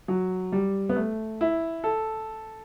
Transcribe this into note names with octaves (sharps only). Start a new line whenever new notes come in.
F#3
G3
B3
A3
E4
A4